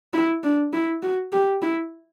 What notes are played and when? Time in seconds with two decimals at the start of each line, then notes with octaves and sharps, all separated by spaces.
0.14 E4
0.44 D4
0.73 E4
1.03 F#4
1.33 G4
1.62 E4